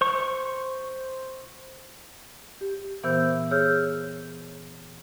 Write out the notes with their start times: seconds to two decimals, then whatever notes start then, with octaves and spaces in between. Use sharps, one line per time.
0.01 C5 C#6
2.61 G4
3.03 A#2 E3 B3 C5 E6 G6
3.51 G#4 C#5 E6 F6 G6